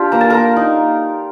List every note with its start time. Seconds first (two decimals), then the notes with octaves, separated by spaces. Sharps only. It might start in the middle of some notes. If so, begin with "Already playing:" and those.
Already playing: D4 F4 G4 F5
0.12 A#3 A#5
0.21 A5
0.30 A#3 A#4 A#5
0.56 D#4